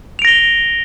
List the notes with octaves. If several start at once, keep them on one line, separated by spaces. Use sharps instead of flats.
A#6 D7 F7 G7